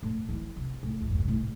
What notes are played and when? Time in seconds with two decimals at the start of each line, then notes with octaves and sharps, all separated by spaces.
0.03 A2
0.29 E3
0.57 C3
0.83 A2
1.01 E2
1.10 G2
1.20 C3
1.28 A2